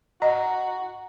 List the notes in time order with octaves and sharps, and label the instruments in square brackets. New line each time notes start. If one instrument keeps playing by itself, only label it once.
[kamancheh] F#4 [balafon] D#5 [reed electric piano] A#5